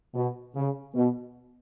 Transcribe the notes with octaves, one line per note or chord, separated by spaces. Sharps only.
B2
C#3
B2